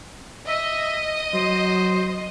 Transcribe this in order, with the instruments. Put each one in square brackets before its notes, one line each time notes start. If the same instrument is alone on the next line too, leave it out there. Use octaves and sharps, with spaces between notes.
[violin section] D#5 [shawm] E5
[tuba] F#3 [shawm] C5